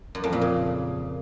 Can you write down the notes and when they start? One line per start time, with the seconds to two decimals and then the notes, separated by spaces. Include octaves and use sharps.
0.15 F#2
0.24 F2
0.33 A#2
0.41 C#3